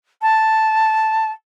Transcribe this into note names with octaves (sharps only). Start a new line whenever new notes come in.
A5